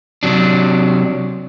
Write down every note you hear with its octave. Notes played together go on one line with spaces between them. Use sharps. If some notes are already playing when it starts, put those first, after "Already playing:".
C3 F#3 D4